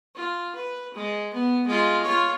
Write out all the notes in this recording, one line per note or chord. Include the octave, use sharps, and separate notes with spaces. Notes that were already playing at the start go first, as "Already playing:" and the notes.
F4
B4
G#3
B3
G#3 F4
F4 C#5